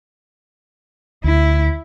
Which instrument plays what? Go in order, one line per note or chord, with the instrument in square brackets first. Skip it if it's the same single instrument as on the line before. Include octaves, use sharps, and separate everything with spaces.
[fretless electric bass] D2 [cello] E4